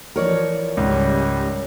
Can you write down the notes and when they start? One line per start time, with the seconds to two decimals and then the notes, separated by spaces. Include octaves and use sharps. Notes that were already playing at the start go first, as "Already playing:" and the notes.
0.16 E3 F3 A#4 C#5 D5
0.77 C#2 G#2 G3 C#4